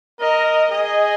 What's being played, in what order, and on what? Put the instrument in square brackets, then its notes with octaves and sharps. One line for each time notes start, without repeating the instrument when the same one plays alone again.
[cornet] A#4 [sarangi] D#5
[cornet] G#4 [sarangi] D#5